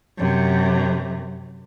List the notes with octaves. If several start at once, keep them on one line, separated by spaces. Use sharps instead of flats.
F#2 C3